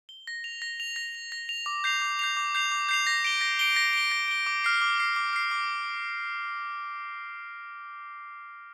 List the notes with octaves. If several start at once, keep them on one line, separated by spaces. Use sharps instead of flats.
G7
A#6
F7
A#6
F7
A#6
F7
A#6
F7
D6
G6 C7 F7
D6
G6 C7 F7
D6
G6 C7 F7
D6
G6 C7 F7
A#6
D7 G7
A#6
D7 G7
A#6
D7 G7
A#6
D7 G7
D6
F6 C7
D6
F6 C7
D6
F6 C7
D6